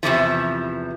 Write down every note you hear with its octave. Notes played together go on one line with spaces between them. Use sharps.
E2 C3 E3 F3